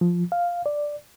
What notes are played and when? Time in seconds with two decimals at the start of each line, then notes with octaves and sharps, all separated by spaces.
0.01 F3
0.32 F5
0.66 D5